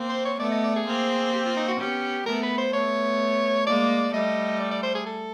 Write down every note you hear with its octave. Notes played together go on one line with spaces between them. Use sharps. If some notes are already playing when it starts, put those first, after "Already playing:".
Already playing: A#3 C4
C5
C#5
A3 B3 D5
D#5
D5
G#4
A#3 C4
G4
F4
D#4
F#4
B3 C#4 G4
A3 B3 A#4
B4
C5
A3 B3 C#5
G#3 A#3 D5
G3 A3 D#5
D5
D5
C5
G#4
A4